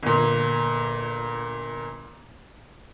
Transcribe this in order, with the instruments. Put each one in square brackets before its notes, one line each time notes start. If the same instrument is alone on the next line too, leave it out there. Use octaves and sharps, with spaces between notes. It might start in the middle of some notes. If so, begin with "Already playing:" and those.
[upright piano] G1 A#2